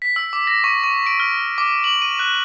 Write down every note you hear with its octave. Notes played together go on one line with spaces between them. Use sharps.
B6
E6
D6
A#6
C#6
C#6
D7
F6
D6
F#7
D#7
F#6